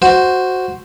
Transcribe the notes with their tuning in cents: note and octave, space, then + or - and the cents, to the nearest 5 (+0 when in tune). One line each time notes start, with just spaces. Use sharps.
F#4 +0 C5 +0